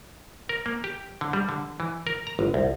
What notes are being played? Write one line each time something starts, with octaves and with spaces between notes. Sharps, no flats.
A#4
A#3
G4
D3
G3
D3
E3
A#4
A#5
G1
C2